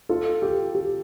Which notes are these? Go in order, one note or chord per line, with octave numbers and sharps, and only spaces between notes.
F4 A4
G4
G4